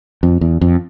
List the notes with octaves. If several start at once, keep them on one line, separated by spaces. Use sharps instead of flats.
F2
E2
F2